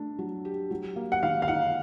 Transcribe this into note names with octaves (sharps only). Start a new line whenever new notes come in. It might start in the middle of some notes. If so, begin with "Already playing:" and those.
Already playing: A3 D4
F#3
G4
F#3
A#3
F#5
D#3 F5
F5
D#4 F#5